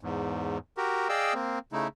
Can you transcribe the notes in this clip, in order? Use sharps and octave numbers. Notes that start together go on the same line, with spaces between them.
E2 G#2
F#4 G4 A#4
G#4 D5 D#5 F5 G5 E6
A#3 C4
C#3 A3 D#4 E4